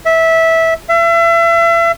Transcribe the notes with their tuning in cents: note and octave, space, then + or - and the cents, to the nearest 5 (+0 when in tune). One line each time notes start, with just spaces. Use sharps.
E5 -15
E5 +35